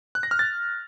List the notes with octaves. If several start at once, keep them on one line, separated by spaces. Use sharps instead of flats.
F#6
A#6
F6
A6